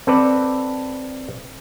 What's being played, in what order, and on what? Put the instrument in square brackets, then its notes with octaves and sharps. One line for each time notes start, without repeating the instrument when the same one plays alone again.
[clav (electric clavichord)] C4 A4 B4 D5